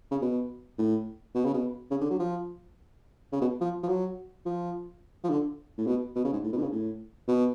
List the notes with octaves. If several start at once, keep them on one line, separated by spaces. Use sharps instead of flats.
C#3
B2
A2
B2
C#3
B2
C#3
D3
F#3
F3
C#3
B2
F3
F3
F#3
F3
F3
D3
A2
B2
B2
C#3
G#2
A2
B2
D3
C#3
A2
B2